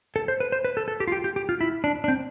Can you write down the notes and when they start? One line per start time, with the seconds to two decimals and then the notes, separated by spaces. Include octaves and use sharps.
0.16 A4
0.28 C5
0.40 B4
0.52 C5
0.65 B4
0.77 A4
0.88 A4
1.00 G4
1.08 F4
1.12 G4
1.24 G4
1.36 G4
1.49 F4
1.61 E4
1.84 D4
2.04 D4
2.08 C4